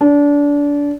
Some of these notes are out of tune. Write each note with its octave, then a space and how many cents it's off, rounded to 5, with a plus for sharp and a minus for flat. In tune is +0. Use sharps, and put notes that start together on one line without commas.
D4 -25